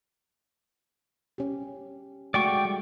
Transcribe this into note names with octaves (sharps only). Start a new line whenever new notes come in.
C#4 G4
G#3 A3 F#4 D5 G5 C#6
G3